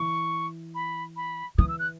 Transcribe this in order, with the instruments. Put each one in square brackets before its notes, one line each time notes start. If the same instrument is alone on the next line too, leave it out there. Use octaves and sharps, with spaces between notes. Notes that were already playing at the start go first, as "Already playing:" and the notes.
Already playing: [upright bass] E3 [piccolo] C#6
[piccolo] B5
B5
[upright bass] E3 [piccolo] D#6
[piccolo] E6
F#6